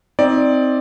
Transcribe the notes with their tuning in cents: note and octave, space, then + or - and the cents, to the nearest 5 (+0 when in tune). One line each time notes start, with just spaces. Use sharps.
C4 +0 D#4 +20 D5 +0